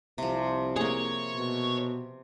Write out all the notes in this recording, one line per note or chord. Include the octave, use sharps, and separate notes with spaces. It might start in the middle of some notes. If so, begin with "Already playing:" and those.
C2 C3 F3
A#3 G#4 C#5
B2